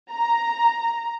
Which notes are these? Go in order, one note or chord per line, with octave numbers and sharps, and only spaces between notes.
A#5